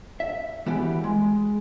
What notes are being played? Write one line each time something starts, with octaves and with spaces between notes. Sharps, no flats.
E5
E3 G3 B3 F#4 G4
G#3